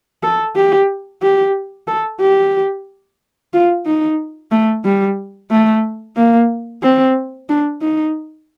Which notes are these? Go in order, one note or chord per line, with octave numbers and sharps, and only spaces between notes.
A4
G4
G4
A4
G4
F4
D#4
A3
G3
A3
A#3
C4
D4
D#4